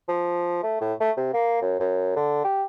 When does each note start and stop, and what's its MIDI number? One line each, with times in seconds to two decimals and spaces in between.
0.08 0.63 53
0.63 0.78 57
0.81 0.94 45
1.00 1.11 57
1.17 1.31 48
1.34 1.58 58
1.62 1.76 42
1.80 2.13 42
2.16 2.44 50
2.44 2.64 67